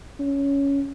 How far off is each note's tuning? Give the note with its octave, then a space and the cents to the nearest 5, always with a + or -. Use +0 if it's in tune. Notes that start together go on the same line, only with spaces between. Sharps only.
C#4 +10